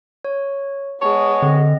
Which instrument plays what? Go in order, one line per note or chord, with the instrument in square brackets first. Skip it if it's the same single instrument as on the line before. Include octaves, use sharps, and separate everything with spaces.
[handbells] C#5
[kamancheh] G#3 B3 [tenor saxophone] C#5 [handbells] A5
[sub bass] D3 [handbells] C4 D#5